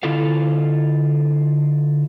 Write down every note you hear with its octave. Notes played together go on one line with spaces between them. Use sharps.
D3 E4 F4 A4 F5